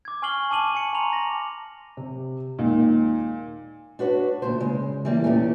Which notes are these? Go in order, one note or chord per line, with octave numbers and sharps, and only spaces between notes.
D6 G#6
G#5 C#6 F6 C7 F#7 G7
A5 D6 D#7 F#7
G#5 C#7
A5 A#5 C6 C#6 F7 F#7
A#6
C3
D#2 A#2 D#3 G#3
D4 F#4 B4 C#5
D2 A#2 C5
C#3 G#3
E3 G3 A#3
E2 A#2 E3 A3 C#4